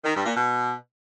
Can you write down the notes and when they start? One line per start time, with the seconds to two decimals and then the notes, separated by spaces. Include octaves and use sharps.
0.04 D#3
0.14 G2
0.24 A#2
0.35 B2